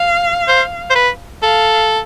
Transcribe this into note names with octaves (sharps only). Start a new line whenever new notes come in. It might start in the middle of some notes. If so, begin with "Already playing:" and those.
Already playing: F5
C5
C5
B4
A4 F5